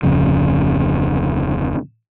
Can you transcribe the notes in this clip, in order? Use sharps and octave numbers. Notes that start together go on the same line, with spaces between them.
D1 F2 C#3